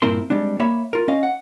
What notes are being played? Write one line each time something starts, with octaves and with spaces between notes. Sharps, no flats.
G2 A#2 C4 E4 A#4 C6
G3 G#3 C4 D4
A#3 C#5 E5 B5
F4 A#4
C#4 D#5 F5
F#5